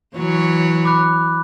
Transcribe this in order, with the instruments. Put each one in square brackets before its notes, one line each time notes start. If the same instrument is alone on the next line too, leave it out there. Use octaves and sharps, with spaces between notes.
[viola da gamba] E3 F#3 C#5
[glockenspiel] B5 D6 F#6